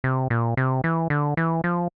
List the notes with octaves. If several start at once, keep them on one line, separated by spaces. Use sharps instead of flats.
C3
A#2
C3
E3
D3
E3
F3